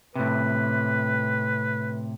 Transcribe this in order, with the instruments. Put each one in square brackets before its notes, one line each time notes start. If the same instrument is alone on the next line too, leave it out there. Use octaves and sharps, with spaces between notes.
[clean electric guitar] A2 C3 [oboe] B4